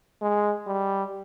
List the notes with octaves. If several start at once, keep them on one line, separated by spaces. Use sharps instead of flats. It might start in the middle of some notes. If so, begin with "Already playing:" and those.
G#3
G3